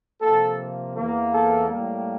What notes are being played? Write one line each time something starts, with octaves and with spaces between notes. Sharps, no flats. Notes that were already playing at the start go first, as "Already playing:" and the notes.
C3 F3 A#3 A4
E2 E3 A#3
A4
A2 G3 A#3